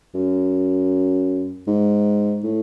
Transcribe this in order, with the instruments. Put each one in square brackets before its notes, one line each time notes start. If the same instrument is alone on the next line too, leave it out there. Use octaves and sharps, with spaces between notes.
[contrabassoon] F#2
G#2
A2